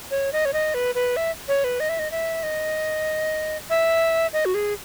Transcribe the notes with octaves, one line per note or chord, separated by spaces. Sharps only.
C#5
D#5
C#5
D#5
B4
B4
E5
C#5
B4
D#5
E5
D#5
E5
D#5
E5
D#5
F#4
G#4